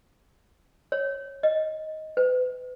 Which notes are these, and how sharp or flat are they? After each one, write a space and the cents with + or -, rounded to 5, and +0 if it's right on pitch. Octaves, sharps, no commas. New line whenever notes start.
C#5 -10
D#5 +10
B4 +35